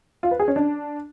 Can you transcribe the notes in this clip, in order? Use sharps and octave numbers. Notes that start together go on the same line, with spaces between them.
F4
B4
G#4
C#4
D4